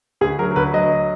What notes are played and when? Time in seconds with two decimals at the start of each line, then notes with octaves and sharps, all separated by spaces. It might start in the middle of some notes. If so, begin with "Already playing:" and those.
0.21 D2 G#4
0.39 F#3 A#4
0.51 A#4
0.56 D2 B4
0.74 F#3 D#5